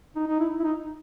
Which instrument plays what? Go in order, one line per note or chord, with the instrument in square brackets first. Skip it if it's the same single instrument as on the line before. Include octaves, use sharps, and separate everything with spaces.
[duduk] D#4
D#4
E4
E4
D#4